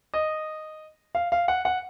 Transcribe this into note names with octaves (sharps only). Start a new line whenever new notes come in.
D#5
F5
F5
F#5
F#5